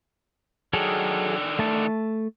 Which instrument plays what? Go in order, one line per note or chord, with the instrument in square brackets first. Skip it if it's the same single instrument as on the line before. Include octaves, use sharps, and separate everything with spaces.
[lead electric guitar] D3 D#3 [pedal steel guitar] F#3 G#4 A4
[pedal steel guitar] A3 A5